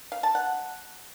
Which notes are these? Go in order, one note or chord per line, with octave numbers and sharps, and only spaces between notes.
F5
A5
F#5